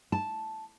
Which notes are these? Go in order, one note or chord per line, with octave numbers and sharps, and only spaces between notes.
A5